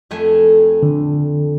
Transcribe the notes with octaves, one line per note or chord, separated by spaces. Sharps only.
F2 A3 G#5
D3